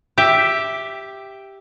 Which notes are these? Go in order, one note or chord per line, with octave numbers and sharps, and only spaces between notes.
G4 E5